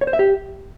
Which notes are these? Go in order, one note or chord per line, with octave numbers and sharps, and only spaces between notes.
C#5
C5
E5
G4